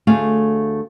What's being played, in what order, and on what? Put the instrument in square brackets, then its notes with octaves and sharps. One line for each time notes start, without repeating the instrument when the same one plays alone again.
[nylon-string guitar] D2 A3 G#4 F5